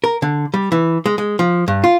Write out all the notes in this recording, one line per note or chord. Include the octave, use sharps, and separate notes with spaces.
A#4
D3
G3
E3
G#3
G#3
F3
G2
F4